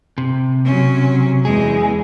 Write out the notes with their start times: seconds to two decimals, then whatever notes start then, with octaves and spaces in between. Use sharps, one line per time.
0.18 C3
0.65 F#3 C#4
1.45 E2 G#3 G#4